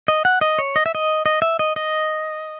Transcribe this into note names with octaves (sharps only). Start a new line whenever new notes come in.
D#5
F#5
D#5
C#5
D#5
E5
D#5
D#5
E5
D#5
D#5